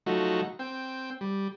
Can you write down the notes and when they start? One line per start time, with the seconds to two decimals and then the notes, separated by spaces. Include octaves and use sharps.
0.06 F3 F#3 A3 D#4 F#4
0.59 C4 G5
1.21 G3